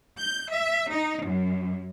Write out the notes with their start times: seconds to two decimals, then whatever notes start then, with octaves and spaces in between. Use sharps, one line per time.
0.18 G6
0.49 E5
0.91 D#4
1.24 F#2